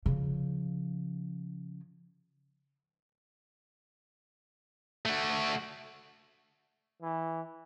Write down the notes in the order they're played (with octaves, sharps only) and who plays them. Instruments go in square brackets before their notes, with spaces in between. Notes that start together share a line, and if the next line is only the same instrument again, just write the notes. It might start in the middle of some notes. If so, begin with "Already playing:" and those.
[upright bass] C#3 F3
[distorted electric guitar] A3 F#4
[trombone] E3